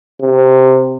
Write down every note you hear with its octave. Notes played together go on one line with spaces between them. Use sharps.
C3